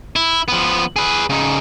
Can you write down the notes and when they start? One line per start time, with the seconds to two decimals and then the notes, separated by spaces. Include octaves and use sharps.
0.16 E4
0.48 F3 B3
0.96 G#4 B4
1.30 C#3 D#4